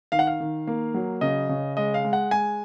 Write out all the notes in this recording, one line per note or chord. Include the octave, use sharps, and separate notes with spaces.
D#3 F5
F#5
F5
D#3
A#3
F#3
C#3 D#5
C#3
G#3 D#5
F5
G#3
F#5
G#3 G#5